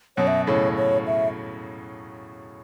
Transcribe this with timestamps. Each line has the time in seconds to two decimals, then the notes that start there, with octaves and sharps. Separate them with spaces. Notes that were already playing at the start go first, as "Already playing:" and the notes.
0.17 F#2 B2 C#5
0.27 E5
0.47 A2 C#3 C#5
0.77 C#5
1.06 E5